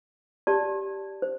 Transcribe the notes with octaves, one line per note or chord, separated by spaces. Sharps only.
G4 D5 A5
C5